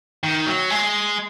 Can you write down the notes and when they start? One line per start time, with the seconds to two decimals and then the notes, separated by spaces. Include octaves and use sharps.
0.23 D#3
0.46 F#3
0.70 G#3